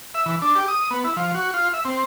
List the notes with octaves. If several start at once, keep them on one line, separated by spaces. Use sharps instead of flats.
E5
E3
D4
G4
D#6
B3
E4
F3
F#4
F4
E5
C4